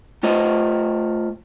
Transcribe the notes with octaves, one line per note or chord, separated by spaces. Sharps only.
A3 F4 C5 D#5